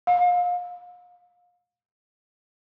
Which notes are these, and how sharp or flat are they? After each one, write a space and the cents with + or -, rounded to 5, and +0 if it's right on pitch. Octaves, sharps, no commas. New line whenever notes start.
F5 +30